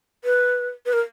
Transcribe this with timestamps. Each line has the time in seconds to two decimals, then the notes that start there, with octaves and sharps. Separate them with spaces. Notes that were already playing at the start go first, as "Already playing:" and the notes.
0.24 B4
0.86 B4
0.93 A#4